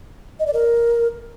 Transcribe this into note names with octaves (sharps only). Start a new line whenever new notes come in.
D#5
D5
A#4